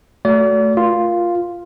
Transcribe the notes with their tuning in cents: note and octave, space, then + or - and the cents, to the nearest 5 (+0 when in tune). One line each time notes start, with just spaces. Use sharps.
A3 +0 F#4 +0 D5 -40
F4 +0 A#4 +20